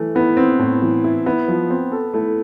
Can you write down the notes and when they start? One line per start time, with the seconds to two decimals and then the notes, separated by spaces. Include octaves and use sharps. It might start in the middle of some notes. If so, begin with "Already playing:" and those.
Already playing: E3 A3
0.15 B3 E4
0.37 B3 C4
0.59 A2
0.82 E3
1.04 E4
1.26 B3 E4
1.48 F3
1.70 C4
1.92 A4
2.14 A3 E4